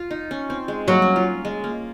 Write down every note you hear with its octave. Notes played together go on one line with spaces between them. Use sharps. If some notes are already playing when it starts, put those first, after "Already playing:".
Already playing: F4
D#4
C#4
C4
G#3
F#3 A#3
C#4
F4
G#3
A#3